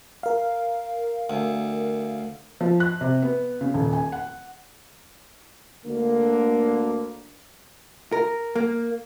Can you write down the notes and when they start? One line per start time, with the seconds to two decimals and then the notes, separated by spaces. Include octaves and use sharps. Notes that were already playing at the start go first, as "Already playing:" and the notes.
0.23 A#4 F5
1.30 D2
2.61 F3
2.80 F#6
3.01 C3
3.22 B3
3.61 C#3
3.74 D#1
3.93 G#5
4.12 F#5
5.86 D2 D3 A#3
8.12 A#4
8.56 A#3